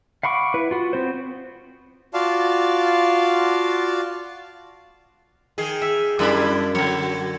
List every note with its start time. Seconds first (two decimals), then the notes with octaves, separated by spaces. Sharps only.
0.23 F5 F#5 B5 C#6 D6
0.54 E4 B4
0.71 F4 F#4
0.93 B3 C4 C5
2.14 F4 F#4 D5 F5 A5
5.58 D#3 G#4
5.82 E5
6.19 F#2 G3 D4 E4 F4 B5
6.75 D3 F#3 C#5